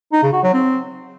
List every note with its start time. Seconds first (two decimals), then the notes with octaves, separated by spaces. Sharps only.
0.12 D#4
0.23 C#3
0.33 F#4
0.43 F#3
0.53 C4